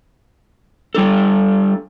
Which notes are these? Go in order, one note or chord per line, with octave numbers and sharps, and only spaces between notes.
G3 D4 A4